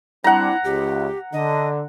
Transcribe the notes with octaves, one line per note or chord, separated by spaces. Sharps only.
G3 C4 D4 E4 F#5 A#5
C#2 G4
D3 D#5